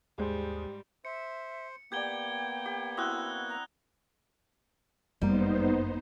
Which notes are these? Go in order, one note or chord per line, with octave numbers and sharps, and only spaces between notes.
D#2 G#2 G3 G#3 G#4 C5
C5 E5 C#7
A#3 B3 G4 D5 G5 G6 G#6 G7
G4
C4 E4 F#4 D#6 E6 F#6 G7
A#5
G1 F#2 G3 A#3 B3 D#4 C5